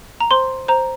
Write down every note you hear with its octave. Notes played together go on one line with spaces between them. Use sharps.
A#5
C5 C6
C5 A#5